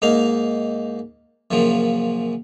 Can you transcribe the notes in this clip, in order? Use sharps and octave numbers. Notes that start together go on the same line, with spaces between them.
G#2 A#3 D#4 F5
F#2 A#2 C#3 F3